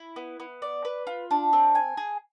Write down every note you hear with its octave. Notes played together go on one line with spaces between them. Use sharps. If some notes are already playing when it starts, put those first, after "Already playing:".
Already playing: E4
B3
B3
D5
B4
F4
D4
C4
G#5
G#4